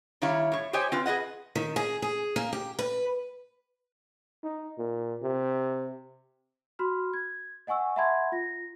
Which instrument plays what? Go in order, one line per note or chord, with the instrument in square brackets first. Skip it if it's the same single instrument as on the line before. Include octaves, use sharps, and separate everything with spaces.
[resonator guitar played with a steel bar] D#3 G3 E4 C#5 F5
A2 C#5
G4 C5 C#5 D#5 G5 G#5
C4 F4 B4
G#4 B4 D#5 F#5
[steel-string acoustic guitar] D#3
G#4
G#4
A#3
G4
B4
[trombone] D#4
A#2
C3
[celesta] F#4 B5 C6 F6
G#6
D#5 F#5 G#5 C#6 E6
E5 F#5 A5 B5 C6 G#6
F4 A#6